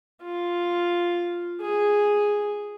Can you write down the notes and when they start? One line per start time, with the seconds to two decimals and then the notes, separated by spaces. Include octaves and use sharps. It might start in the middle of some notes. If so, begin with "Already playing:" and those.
0.22 F4
1.61 G#4